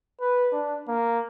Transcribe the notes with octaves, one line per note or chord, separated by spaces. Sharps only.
B4
D4
A#3